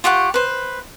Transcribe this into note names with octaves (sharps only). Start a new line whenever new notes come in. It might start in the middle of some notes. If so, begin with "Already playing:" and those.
F4 G4 F#5 C#6
B4 C5